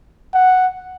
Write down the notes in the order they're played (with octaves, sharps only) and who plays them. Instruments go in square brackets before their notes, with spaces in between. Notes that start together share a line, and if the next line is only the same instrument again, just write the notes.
[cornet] F#5